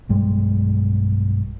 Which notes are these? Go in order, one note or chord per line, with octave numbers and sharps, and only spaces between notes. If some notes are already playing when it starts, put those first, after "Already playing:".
B1 G2 G3 G#3